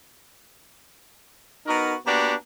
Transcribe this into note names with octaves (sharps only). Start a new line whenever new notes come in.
B3 D#4 F#4 A#4
A#3 B3 D4 F#4 G4